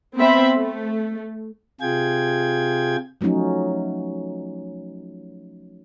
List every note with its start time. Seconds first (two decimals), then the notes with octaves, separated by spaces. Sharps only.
0.16 B3 C4 E5 B5
0.56 A3
1.81 C3 F4 G#4 G5 G#6
3.21 F3 F#3 A3 C#4 D#4